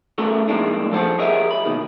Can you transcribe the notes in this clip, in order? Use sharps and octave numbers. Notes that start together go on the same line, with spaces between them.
A3 B3 C#4 F#4 A4 A#4
F2 A2 G#3 A#3 D4 D#4
F3 A4 C5 F#5 A5
G4 G#4 A#4 C#5 D#5 E5
B5
D#2 G#2 B2 D#3